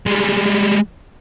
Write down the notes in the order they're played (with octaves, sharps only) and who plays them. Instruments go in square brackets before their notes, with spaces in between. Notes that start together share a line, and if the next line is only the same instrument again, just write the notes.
[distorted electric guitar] G3 G#3